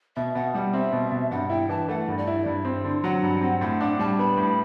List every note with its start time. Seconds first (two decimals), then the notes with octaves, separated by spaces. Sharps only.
0.16 B2 E5
0.35 B2 F#5
0.54 G3 F#5
0.73 C4 E5
0.93 B2
1.12 B2
1.31 G2 F#5
1.50 E4 G5
1.69 E3 A5
1.89 A3 F#5
2.08 G2
2.18 D5
2.27 E4
2.46 G2
2.65 C4
2.84 D3
3.04 F#3 F#5
3.23 G2
3.41 C4
3.61 A2 F#5
3.80 D4 F#5
3.99 G3 A5
4.19 B3 B5
4.37 A2